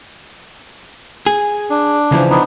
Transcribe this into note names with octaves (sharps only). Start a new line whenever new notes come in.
G#4
D4
C#3 E3 F3
B3 D4 D#4